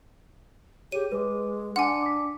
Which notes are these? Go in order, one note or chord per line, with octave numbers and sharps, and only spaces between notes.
G4 G#4 C#5 D#7
G#3 B4 D6
D4 F#5 G#5 C6 D6 C#7
D6 B6